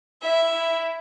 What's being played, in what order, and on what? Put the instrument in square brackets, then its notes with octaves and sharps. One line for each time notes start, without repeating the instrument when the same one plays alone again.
[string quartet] E4 [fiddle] E5
[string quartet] E4